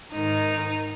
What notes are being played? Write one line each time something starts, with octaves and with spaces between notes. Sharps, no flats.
G#2 D#3 D#4